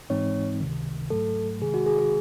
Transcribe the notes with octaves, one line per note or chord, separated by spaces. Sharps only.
G#2 E3 G#3 C4 D#4 C#5
C#2 C3 D#3
G#2 F#3 A3 A4
C3 D#3 G#3 G#4
F#4
G#4
G#4